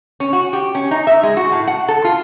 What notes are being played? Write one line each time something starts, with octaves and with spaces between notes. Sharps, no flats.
C#4
F#4
G4
C#4
D#4
E5
G#3
F#4
A2
F#5
A4
F4